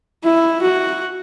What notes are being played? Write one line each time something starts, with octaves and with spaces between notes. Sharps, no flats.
E4
F#4